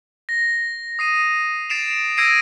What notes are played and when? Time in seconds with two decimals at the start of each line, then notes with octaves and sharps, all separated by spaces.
0.29 A#6
0.99 D#6 C7 D#7
1.70 A6 C7 D7 E7 F7
2.17 E6 G#6 A#6 C7 D7 D#7